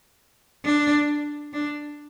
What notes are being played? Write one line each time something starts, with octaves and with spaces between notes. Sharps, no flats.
D4
D4